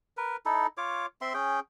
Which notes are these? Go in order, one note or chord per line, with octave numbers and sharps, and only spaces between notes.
A#4 B4
D#4 E4 A4
F4 C#5 D6
C4 E5 C6
C#4 G#4 G5